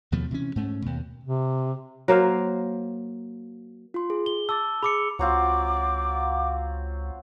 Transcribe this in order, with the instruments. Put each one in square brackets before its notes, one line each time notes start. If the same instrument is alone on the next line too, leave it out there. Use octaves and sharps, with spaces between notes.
[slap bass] D#2 B2 F3 A3
C3 E3 C#4
G#2 A3 C#4
D#2 B2
[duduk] C3
[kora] F#3 A#3 C5 F5
[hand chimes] F4 C6
G#4
[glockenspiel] G7
[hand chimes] A5 D6 A6 [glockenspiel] E6
[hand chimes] G#4 [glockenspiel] B5 D6 C#7
[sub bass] C#2 [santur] F#3 C4 F4 [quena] D6